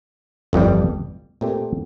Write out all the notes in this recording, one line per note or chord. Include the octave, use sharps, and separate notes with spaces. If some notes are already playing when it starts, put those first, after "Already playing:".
G1 F2 E3 G3
A#2 A3 C4 G4